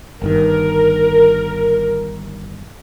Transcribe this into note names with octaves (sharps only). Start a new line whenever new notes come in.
G1 G2 D#3 A#4